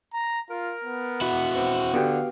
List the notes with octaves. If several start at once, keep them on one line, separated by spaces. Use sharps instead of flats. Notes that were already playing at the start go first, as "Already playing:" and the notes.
A#5
F4 A#4
B3
E4 F#4 B4
C4
D3 B3 F#4 G4 F5